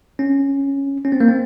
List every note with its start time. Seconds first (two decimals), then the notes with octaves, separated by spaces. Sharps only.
0.19 C#4
1.05 C#4
1.12 C4
1.20 A#3
1.28 C4